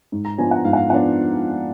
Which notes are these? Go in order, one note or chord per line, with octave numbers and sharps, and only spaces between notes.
G#2
A#5
F3 B3 D4 G#5
F#5
G#2 F5
F#5
F5
F3 B3 D4 F#5